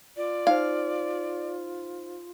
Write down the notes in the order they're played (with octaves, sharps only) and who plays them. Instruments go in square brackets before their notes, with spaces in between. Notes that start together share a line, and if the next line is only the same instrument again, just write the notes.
[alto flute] F4 [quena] D5
[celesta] D#4 C5 [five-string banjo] F5